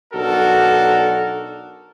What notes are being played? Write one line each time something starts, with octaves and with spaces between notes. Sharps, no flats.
B1 D4 F#4 A4 A#4